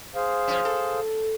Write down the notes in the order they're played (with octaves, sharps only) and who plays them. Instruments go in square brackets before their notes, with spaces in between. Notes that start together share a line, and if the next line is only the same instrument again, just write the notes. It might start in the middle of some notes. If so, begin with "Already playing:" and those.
[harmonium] G#4 C5 F5
[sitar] F3 C#4
A4